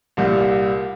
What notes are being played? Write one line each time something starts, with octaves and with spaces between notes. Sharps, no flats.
C2 A#2 G3